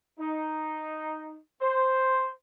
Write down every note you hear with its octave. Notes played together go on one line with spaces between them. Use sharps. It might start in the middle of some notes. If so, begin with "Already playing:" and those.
D#4
C5